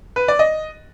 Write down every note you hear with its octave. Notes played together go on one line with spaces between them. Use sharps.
B4
D5
D#5